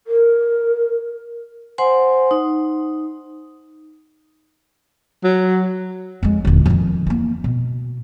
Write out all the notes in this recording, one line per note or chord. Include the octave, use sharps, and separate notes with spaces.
A#4
C5 F#5 G#5 C6
D#4
F#3
F2 G#3
D#1 D3
F2 D#3
E3 A#3
B2